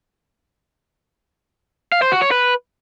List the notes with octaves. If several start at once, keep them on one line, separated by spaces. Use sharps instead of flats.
F5
C5
F#4
C#5
B4